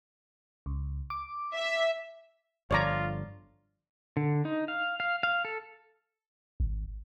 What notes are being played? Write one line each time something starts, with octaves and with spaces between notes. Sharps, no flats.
C#2
D6
E5
G1 D3 F3 F4 C#5 D5 A#5
D3
D#4
F5
F5
F5
A4
G#1